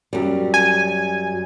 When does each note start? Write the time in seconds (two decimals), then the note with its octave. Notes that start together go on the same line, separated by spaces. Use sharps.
0.13 F#2 G3
0.54 G#5